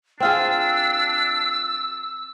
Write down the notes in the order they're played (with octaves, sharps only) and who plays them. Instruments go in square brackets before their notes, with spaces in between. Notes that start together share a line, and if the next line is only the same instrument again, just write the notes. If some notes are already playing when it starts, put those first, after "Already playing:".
[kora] C4 F4 G#4 [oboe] D4 [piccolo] E6